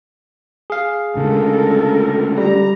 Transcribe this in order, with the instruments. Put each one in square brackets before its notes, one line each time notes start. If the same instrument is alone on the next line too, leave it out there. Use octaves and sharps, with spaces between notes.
[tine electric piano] G#4 F5
[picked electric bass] D2 C#3 G#3 [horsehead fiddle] A4 A#4
[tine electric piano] G3 [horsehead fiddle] A#5